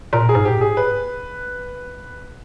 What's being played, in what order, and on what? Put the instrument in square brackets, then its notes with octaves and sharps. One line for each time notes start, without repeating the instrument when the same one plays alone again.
[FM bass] A#2 [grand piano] A#4
[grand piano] G#4
[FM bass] G#2
[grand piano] G4
[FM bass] A#2
G#2
[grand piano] G#4
B4